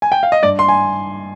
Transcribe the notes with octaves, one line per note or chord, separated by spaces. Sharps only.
G#5
G5
F5
D#5
G2 D5
C6
G#5